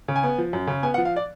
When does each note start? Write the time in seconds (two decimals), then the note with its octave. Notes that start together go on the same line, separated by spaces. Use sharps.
0.08 C#3
0.16 G#5
0.23 B3
0.38 F3
0.53 F#2
0.67 C#3
0.83 B3 G#5
0.94 F#5
0.98 F3
1.05 F5
1.16 D5